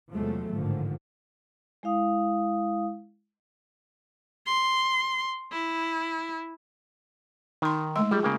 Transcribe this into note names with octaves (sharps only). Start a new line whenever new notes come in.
E2 C3 F3 F#3 G#3 A3
A1 G#2 D3 D#3 F3
G#3 E4 F5 D#6
C6
E4
D#3 D#4 C6
G#3 A3 C6
G3 F4 G#4
C#3 A#3 G5